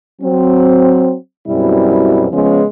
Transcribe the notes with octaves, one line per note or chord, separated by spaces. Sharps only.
F#3 C4
F#2 B2 G3 C4 E4
C#3 F3 G#3 B3 C#4